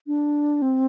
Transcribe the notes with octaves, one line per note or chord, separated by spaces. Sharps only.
D4
C4